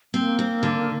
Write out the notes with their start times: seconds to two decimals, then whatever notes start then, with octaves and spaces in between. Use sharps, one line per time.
0.14 A#3 C4
0.39 C4
0.63 D3